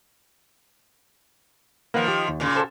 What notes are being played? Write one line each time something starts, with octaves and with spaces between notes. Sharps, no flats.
D#3 F3 A#3 B4 F#5
G4
D#2
A#2 C#3
A4 C5